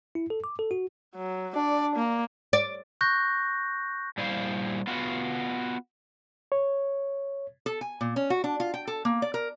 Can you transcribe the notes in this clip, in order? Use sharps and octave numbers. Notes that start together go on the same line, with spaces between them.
E4
A4
D6
A4
F#4
F#3
D4 D5
A#3
D5
C#6 F#6 G6 A#6
A#2 G3 E4 C5 F5
B3 F4 F#4
C#5
A4
G#5
A#2
C#4
F#4
D4
F4
G5
A4
A#3
D5
A#4